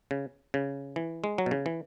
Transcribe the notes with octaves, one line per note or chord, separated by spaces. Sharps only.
C#3
C#3
E3
G#3
F#3
B2
C#3
E3